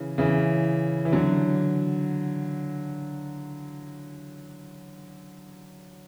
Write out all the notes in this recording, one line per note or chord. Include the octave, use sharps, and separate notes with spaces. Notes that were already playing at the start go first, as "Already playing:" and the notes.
Already playing: C#3 E3
C#3 E3
E3
D3 F#3